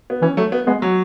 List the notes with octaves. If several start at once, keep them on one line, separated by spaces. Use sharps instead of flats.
B3
E3 C#4
F#3 A3
B3
G#3 B3
F#3